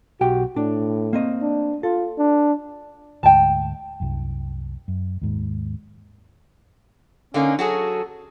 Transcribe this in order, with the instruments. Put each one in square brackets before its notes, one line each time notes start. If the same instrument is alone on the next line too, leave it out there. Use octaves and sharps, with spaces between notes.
[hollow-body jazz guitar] B1 G4 G5 [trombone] F#4
[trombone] A2 [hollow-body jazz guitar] D4
[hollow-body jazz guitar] A#3 C4 D#5
[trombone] D4
[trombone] F4 [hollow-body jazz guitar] A4
[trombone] D4
[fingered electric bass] D2 G#2 [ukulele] G5 A5
[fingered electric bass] C2 F#2
F#2
D#2 G#2
[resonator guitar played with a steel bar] D3 A#3 D#4 [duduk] C#4
[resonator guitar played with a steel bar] F#3 F#4 G#4 [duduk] A4